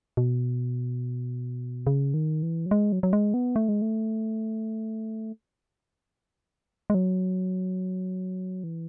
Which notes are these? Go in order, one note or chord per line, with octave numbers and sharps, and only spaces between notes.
B2
C#3
D#3
E3
F#3
G#3
F#3
F#3
G#3
B3
A3
G#3
A3
G#3
F#3
E3